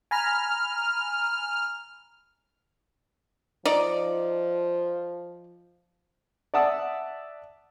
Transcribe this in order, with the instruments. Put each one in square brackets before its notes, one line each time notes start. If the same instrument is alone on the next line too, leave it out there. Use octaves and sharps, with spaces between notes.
[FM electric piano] G#5 A#5 B5 [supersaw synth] F6
[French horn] F3 [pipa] D#4 D5
[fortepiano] D5 E5 F#5 A5 D#6 E6